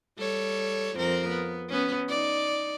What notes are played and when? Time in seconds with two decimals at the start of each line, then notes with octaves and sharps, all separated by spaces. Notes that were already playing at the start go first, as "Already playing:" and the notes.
0.18 G3 A4 C#5
0.97 F2 C4 A#4
1.29 B3
1.69 B3 C#4
2.08 D#4 D5